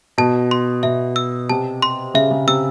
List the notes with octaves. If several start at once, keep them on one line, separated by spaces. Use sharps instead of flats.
B2 A5
C6
B2 E5
E6
C3 A5
C6
C#3 E5
C#3
C3 E6